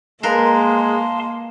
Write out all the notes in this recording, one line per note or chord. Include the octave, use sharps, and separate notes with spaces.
G#3 A#3 A#4 B4 F5 A5 C6